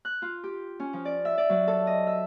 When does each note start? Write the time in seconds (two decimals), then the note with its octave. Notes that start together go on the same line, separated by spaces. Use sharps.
0.05 F#6
0.22 F4
0.44 G4
0.80 C#4
0.93 F3
1.05 D5
1.25 E5
1.38 D5
1.49 F#3
1.68 A4
1.87 D#5
2.07 E5